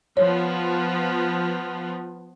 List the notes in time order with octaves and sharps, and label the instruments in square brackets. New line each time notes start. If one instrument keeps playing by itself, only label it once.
[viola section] F3 B3 [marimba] C#5